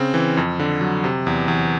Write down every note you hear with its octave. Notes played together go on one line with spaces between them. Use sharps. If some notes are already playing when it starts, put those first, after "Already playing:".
Already playing: C#3 C4
E3
F2
D3
F#3
C3
E2
E2